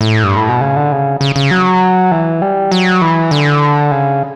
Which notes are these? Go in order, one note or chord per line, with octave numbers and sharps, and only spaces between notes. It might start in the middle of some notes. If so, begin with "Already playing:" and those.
A2
G2
A2
B2
C#3
D3
C#3
C#3
C#3
F#3
E3
G3
F#3
E3
D3
C#3